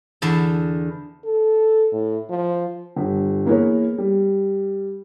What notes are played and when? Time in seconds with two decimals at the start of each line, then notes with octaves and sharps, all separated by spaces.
0.22 E2 D3 A5
1.24 A4
1.92 A2
2.30 F3
2.96 G1 G3
3.46 E3 A#3 B3 G#4 A#4 C#5
3.98 G3